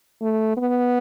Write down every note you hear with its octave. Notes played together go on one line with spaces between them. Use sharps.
A3
B3